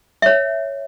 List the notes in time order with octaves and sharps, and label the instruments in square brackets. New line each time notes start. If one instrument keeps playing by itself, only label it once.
[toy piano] C#5 E5